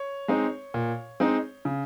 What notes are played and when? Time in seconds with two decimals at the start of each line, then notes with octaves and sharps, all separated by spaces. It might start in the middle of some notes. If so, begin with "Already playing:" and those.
Already playing: C#5
0.28 G#3 C4 D#4
0.74 A#2
1.20 G#3 C4 D#4
1.65 C#3